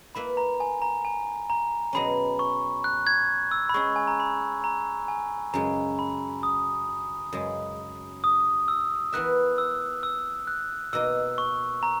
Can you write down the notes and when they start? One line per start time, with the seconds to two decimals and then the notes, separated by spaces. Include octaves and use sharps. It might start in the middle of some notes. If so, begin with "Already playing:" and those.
0.15 A#3 E4 B4 E5 B5
0.37 A#5
0.60 G#5
0.82 A#5
1.05 G#5
1.50 A#5
1.93 B2 F#3 C#4 G#4 D#5 B5
2.39 C#6
2.84 F#6
3.07 G#6
3.51 E6
3.69 B5
3.74 G#3 C#4 G#4 C#6
3.96 G#5
4.07 A#5
4.20 B5
4.64 A#5
5.08 G#5
5.54 F#2 C#3 G#3 A#5
5.99 B5
6.43 D#6
7.33 F#2 C#3 G#3
8.24 D#6
8.68 E6
9.13 E3 B3 E4 A#4 E5 F#6
9.58 E6
10.03 E6
10.47 F#6
10.93 B2 A#3 D#4 A#4 D#5 E6
11.38 C#6
11.83 A#5